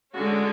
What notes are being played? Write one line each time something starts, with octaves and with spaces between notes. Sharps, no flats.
D3 G#3 C#4 F#4